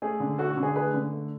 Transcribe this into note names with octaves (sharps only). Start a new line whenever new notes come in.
A3 G#4
D3
A3 F#4 A4
F#4
D3
G#4
A3 G#4 B4
D3
A3